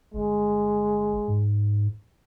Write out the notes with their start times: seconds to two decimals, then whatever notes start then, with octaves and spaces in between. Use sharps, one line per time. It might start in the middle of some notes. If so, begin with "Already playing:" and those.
0.14 G1 G#3
1.28 G#2